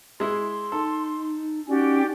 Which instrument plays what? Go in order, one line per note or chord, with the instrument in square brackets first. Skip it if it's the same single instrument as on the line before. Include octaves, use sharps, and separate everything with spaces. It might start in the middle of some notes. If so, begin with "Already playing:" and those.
[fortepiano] G#3 E4 [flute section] C6
[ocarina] D#4 [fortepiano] A4
[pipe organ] C#4 [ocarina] D#4 [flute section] F#4 G4 D5